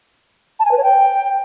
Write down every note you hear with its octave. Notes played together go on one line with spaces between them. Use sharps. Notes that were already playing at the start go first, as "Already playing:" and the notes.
A5
G#5
B4
C#5
G5